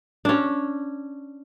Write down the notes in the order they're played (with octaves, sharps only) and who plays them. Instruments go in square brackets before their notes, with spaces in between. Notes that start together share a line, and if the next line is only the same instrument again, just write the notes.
[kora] C#4 D4